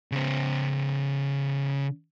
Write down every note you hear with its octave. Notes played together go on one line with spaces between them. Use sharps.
C#3 C5